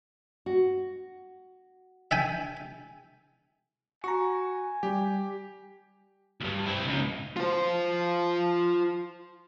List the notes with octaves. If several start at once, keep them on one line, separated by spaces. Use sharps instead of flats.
F#4
E5 G5 G#5
F#4 G#5 A#5 C#6
G3 G4
D2 G2
C4 E4
C#2 D#4
F4 C5